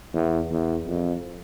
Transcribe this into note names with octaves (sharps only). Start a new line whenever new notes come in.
E2
E2
F2